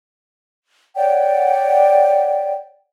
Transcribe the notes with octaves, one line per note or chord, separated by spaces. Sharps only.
C#5 D5 F#5 G5